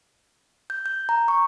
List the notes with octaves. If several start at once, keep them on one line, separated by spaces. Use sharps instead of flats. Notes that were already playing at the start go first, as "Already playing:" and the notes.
G6
G6
A#5
C#6